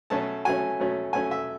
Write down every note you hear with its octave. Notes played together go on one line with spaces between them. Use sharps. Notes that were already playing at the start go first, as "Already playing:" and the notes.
B2 F#3 A3 C#4 A5
B2 F#3 A3 C#4 G#5
B2 F#3 A3 C#4
B2 F#3 A3 C#4 G#5
E5